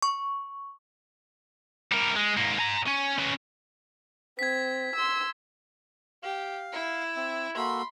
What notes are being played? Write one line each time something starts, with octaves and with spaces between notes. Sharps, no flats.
C#6
G3 A#4
G#3
G#2 A#3
G#5 A#5
C#4
C#4 B4
C4 G#6 B6
C6 E6
G4 F5
E4
C4 E5
A#3 F#4 A4 B5 C6